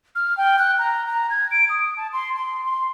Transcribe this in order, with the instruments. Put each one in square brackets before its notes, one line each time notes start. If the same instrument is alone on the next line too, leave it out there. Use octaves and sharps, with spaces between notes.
[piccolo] F6
G5
F#6
A#5
A#5
G#6
D7
D#6
A5
C6
C6
C6